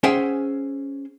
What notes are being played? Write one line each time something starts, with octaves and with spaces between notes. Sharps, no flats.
C#4 G#4 C5 E5 F#5 G5